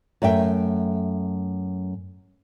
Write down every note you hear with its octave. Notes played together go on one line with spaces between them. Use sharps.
F#2 A3 E5 G5